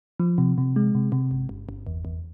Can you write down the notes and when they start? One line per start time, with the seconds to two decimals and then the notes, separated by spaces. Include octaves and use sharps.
0.20 F3
0.38 C3
0.58 C3
0.76 G#3
0.95 C3
1.12 C3
1.31 G1
1.49 G1
1.69 G1
1.87 E2
2.05 E2